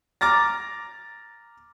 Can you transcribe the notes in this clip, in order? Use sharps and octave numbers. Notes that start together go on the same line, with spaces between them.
A#5 D6 F6 A6 A#6